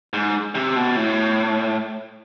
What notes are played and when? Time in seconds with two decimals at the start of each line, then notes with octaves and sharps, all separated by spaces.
0.13 G#2
0.55 C3
0.76 B2
0.97 A2